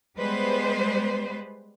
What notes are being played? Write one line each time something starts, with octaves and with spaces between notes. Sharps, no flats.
G3 G#3 B3 B4 C5